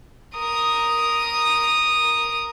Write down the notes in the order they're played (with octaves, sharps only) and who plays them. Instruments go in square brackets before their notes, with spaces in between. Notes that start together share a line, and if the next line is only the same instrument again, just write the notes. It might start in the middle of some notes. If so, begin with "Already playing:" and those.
[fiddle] A#4 D#6